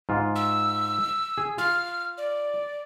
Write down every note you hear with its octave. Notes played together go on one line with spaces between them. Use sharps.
G#2 F4
E6
G#4
F4 F6
D5